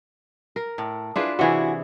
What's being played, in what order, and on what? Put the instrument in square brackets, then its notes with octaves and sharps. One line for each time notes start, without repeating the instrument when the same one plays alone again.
[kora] A#4
[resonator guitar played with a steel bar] A2
[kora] D4 F4 B4 [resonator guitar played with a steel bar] E4 G#4
[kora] C3 E3 G#4 [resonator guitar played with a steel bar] E4 F#4